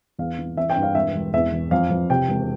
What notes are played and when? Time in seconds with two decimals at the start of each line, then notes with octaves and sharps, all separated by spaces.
0.19 E2 F5
0.38 E3
0.57 E3 E5
0.70 G5
0.76 G2
0.82 F5
0.95 E1 E5
1.14 E1
1.34 E2 E5
1.53 E3
1.71 F2 F5
1.90 F2
2.10 C3 G5
2.29 E1